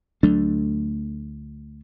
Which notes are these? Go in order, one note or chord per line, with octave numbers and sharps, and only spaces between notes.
D2 F#3 A3 D4